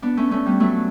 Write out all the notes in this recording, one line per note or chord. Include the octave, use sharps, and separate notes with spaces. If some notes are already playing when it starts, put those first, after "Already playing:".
B3 D4
A3 C#4
A3 C#4
G3 B3
F#3 A3